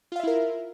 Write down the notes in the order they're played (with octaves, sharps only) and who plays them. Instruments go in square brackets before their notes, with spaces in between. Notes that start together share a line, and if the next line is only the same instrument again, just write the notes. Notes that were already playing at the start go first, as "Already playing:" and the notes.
[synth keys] F4
F5
E5
E4
A#4